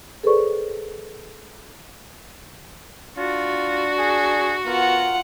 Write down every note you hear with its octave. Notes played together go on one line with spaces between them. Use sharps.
G#4 A4 B4 C5 D5 C#6
D4 F4 F#4
G#4
B3 F4 A#4 F#5